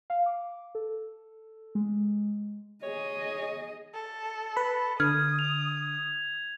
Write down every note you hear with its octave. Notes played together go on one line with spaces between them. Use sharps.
F5
D6
A4
G#3
G#4 C#5 D#5
A4
B4 B5
D3 D#6 F6 G#6
F7